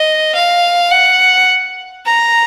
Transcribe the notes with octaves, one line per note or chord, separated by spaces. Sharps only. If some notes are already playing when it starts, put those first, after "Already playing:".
Already playing: D#5
F5
F#5
A#5